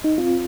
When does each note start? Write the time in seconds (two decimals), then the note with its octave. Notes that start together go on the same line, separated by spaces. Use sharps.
0.04 D#4
0.18 C4 F4